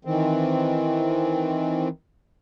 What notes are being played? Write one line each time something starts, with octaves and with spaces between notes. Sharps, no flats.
D#3 E3 C4